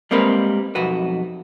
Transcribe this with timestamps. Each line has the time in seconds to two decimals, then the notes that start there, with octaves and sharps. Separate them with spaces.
0.11 G3 G#3 A#3 C4 A#4 B4
0.75 B1 F2 F#4 B4